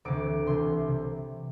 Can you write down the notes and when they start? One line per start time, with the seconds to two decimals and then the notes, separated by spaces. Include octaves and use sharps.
0.05 D2 C3 E3 D6
0.47 C2 C3 E3 C6
0.88 C3